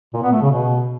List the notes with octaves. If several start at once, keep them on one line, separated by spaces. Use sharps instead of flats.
A#2
B3
A3
C#3
B2